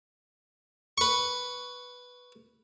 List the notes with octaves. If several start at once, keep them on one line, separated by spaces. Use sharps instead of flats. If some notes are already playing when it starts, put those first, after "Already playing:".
B4 C#6